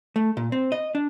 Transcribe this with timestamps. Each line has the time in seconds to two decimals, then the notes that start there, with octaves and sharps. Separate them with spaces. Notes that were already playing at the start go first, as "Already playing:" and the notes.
0.16 A3
0.37 A#2
0.52 C4
0.72 D#5
0.95 D4